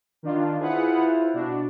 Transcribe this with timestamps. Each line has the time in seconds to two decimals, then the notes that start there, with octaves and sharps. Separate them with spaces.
0.23 D#3 D4 F4
0.59 E4 F4 G#4 B4 C5 F#5
1.34 B2 D4 F#4